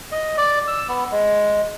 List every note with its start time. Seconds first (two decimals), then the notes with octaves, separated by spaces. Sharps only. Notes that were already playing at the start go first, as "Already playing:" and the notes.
0.12 D#5
0.37 D5
0.68 E6
0.88 B3
1.12 G#3